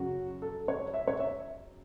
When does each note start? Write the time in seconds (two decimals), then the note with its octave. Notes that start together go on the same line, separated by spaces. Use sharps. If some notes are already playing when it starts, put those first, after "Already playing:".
Already playing: F#2 C#3 F#3 F#4
0.42 A4
0.68 C#5
0.94 E5
1.07 C#5
1.20 E5